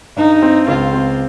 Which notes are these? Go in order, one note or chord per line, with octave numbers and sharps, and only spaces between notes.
G2 D#4
C4
C#2 F4
C4